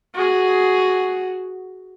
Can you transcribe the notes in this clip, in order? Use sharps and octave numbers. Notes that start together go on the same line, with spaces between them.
F#4 G#4